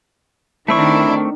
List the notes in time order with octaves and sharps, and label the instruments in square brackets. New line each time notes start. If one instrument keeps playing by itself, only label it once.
[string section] D#3 D4 [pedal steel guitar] A3 C4 C#6 [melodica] E4